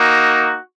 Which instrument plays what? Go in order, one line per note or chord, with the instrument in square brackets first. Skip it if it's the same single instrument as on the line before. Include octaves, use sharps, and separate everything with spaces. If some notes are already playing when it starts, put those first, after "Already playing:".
Already playing: [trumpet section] A#3 D#4 F#4